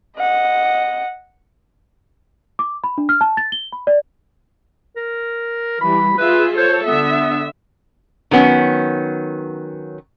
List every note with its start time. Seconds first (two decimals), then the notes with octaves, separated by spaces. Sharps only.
0.17 D#5 F#5
2.59 D6
2.84 B5
2.98 D4
3.09 F6
3.21 A5
3.37 A6
3.52 G7
3.72 B5
3.87 D5
4.97 A#4
5.81 E3 G3 B5
6.18 F4 G#4 B4 E5
6.57 A4 C5 C#5
6.87 D3 B3 E5
8.31 D#3 F#3 B3 C#4